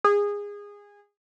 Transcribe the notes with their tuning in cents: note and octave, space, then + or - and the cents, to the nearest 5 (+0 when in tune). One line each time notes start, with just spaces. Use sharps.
G#4 -20